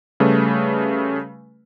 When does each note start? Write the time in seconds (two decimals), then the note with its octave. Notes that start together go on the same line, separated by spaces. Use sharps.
0.20 C#3 G3 A3 B4